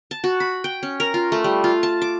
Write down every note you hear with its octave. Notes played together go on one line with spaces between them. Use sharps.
A5
F#4
B5
G5
C#4
A#4
F4
A3
G3
F4
A5
D6